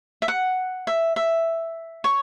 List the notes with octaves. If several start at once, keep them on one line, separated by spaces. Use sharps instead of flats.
E5
F#5
E5
E5
C#5